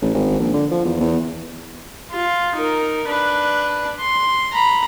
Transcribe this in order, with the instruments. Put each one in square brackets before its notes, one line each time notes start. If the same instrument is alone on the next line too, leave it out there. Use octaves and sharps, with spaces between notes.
[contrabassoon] A1
G#1
A#1
D3
F3
E2
E2
[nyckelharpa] F4
D#4 A#4
D4 B4
C6
A#5 B5